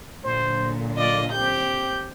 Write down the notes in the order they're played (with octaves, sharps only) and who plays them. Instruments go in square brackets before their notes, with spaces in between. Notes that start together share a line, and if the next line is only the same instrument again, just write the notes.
[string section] A#2 D3 F#3 [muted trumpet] C5
[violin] F4 D#5 [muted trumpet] D5
[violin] C4 G6 [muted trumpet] G4